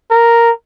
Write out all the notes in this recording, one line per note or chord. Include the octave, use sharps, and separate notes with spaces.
A#4